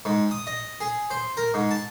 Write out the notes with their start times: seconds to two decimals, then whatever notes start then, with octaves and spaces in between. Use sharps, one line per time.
0.05 G#2
0.31 D#6
0.47 D#5
0.80 G#4
1.10 C5
1.37 A#4
1.54 G#2
1.71 A5